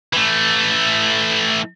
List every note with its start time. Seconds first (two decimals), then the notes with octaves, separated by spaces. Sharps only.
0.13 E3 A3